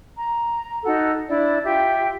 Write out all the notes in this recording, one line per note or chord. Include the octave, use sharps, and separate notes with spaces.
A#5
D#4 F#4 A4 F#5
D4 E4 D5
F4 G4 E5 G5